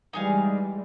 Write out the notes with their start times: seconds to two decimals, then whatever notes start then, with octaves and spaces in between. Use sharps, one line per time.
0.13 E3 G3 G#3 D#4 G#4 F5